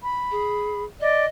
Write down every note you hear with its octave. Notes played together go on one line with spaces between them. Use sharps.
B5
G#4
D5 D#5